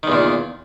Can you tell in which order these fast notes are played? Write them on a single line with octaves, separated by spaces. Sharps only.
D#3 E2 A#2